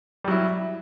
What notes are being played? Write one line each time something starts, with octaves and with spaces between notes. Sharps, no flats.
F#3 G3 E4